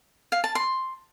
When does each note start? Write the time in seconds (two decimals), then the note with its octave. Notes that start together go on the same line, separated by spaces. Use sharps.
0.32 F5
0.44 A5
0.55 C6